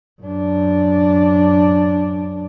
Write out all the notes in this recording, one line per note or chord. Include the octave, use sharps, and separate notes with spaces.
F#2 D4